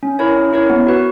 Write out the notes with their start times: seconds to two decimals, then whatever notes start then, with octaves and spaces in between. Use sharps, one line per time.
0.03 C#4
0.19 E4 A#4 C#5
0.37 C#4
0.53 E4 A#4 C#5
0.70 B3
0.87 F#4 B4